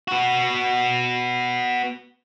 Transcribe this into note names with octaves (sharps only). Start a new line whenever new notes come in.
B3 F#4